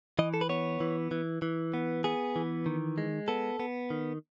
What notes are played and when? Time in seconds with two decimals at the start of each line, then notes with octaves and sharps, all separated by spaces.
0.19 E3 D#5
0.34 A4
0.41 B4
0.49 B3 C#5
0.80 E3
1.11 E3
1.42 E3
1.74 B3
2.04 B3 G#4
2.36 E3
2.66 D#3
2.98 G#3
3.28 B3 A4
3.60 B3
3.90 D#3